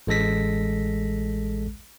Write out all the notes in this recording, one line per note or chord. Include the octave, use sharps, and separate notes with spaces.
A1 G#3 A4 A#6 B6